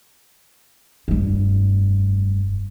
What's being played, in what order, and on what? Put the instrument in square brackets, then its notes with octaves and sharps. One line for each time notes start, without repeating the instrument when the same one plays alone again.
[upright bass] F1 G2